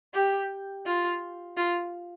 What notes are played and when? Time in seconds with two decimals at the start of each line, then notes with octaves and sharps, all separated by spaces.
0.14 G4
0.86 F4
1.57 F4